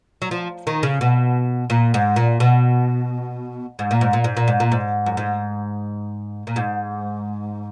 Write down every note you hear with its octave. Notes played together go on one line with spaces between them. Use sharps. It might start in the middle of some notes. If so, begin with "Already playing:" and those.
F#3
F3
D#3
C#3
B2
A#2
G#2
A#2
B2
G#2
A#2
G#2
A#2
G#2
A#2
G#2
A#2
G#2
F#2
G#2
A#2
G#2